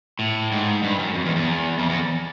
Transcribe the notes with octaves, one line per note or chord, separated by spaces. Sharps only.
A2
G#2
G2
F#2
F2
E2
E2
F2
E2